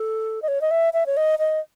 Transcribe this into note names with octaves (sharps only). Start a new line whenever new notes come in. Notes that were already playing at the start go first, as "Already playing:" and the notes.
Already playing: A4
D#5
C#5
D#5
E5
E5
C#5
D#5
D#5